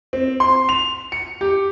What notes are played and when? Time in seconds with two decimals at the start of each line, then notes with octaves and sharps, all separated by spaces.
0.13 C4
0.40 C6
0.69 F7
1.12 C#7
1.41 G4